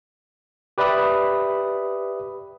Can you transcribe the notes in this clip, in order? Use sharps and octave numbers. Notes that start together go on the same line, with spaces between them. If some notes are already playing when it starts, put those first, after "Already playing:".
G4 B4 D5 E5 B5 D#6